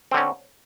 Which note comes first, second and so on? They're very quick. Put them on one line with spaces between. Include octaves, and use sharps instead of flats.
C4 D3 C#4